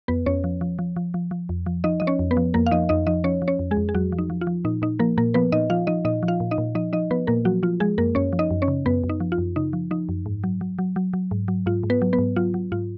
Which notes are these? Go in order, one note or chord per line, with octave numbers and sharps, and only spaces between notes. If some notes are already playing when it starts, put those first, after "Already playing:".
F2 B3 B4
F2 C#4 C#5
F3
F3
F3
F3
F3
F3
F2
F3
F3 D#4 D#5
F3 D#5
C#4 C#5
F2
B3 B4
F3
F2 A#3 A#4
F5
F3 D#4 D#5
F2 D#4 D#5
F3 D#4 D#5
F3 C#4 C#5
F3
C#4 C#5
F2
G#3 G#4
F2
G#4
F2 F#3 F#4
F3
D#4
F3
F4
F3
A#2 D#4
A#2 D#4
F3 A#3 A#4
A#2 A#3 A#4
F3 B3 B4
A#2 D#4 D#5
F3 F4 F5
F3 D#4 D#5
A#2 D#4 D#5
F3
F4 F5
A#2
D#4 D#5
A#2
F3 D#4 D#5
F3 D#4 D#5
F3 B3 B4
A#2 A#3 A#4
F3 F#3 F#4
F3 F4
F3 G#3 G#4
F#2 A#3 A#4
F#2 C#4 C#5
F3
D#4 D#5
F#2
C#4 C#5
C#3
F#2 B3 B4
F#2
D#4
F3
F4
F#2
C#3 D#4
F3
F3 D#4
F#2
G#2
F#3
F#3
F#3
F#3
F#3
G#2
F#3
G#2 F4
G#2
B3 B4
F#3
B3 B4
G#2
F#3 F4
F#3
G#2 F4